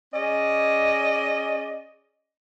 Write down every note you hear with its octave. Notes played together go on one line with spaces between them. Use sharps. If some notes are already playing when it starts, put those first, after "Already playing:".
C#4 G#4 D5 D#5